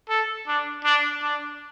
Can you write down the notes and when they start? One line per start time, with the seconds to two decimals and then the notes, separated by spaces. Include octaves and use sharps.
0.09 A4
0.47 D4
0.84 D4
1.22 D4